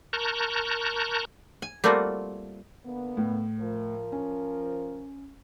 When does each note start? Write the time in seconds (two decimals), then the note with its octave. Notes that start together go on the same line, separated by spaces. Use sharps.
0.13 A#4 A5 A#5 C#6 F#6 G6
1.62 G#5
1.84 G3 A3 A#3 C4 F4 F#4
2.84 D3 A#3 B3
3.17 A2
3.59 F3 A#4
4.12 C#4